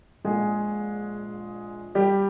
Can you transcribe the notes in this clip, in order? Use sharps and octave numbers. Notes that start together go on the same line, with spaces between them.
A#1 A#2 G#3 G#4
G3 G4